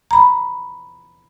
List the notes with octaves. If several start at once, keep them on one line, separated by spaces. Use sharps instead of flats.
A#5 B5